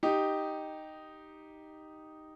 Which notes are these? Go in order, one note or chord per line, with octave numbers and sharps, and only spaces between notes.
D#4 G4